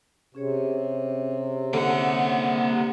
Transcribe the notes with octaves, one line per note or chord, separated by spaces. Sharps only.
C3 C#4 G#4 C#5
D3 A#3 F#5